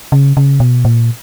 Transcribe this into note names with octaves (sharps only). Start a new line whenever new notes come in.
C#3
C#3
B2
A#2